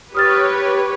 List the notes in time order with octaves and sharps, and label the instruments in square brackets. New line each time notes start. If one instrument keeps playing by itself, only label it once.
[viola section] G4 B4 C#5 [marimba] D#6 F6 A6